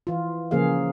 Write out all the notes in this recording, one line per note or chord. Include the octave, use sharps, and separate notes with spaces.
E3 F4
C#3 F3 A#3 G#4 F5